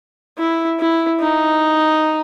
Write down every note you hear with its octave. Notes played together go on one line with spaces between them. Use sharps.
E4
E4
D#4